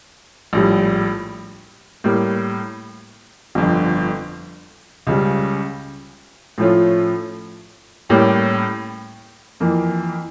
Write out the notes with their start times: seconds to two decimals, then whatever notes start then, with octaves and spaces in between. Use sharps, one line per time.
0.53 A#1 A2 G3
2.04 A2 G3 A#3
3.55 G1 F2 D3
5.07 C#2 C#3 G3
6.58 A2 F3 A3 C#4 F4
8.09 A2 G3 A#3 C#4 G4
9.60 F2 E3 A#3